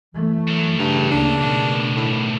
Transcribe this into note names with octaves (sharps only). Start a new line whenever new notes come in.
E3 A3
F#2 F#3
G2 C#3 E3 A#5
D2 A#3 D4
B2 D#3 A3 B3
A2